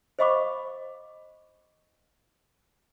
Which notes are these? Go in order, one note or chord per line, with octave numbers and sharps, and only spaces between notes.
C5 D#5 F5 B5 C#6 D6